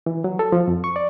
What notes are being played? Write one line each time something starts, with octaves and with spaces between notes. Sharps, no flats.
E3
F#3
A4
F3
F2
C#6
D5